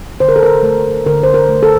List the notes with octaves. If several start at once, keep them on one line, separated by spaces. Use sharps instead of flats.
D3 C5
A#4
A4
A#4
A3
D3 A#4
C5
A#4
A3
A4